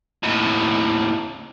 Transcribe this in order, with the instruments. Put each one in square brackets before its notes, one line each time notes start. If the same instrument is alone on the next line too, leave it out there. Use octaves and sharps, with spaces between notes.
[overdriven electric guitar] D#2 A2